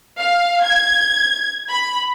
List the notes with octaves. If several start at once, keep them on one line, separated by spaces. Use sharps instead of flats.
F5
G#6
B5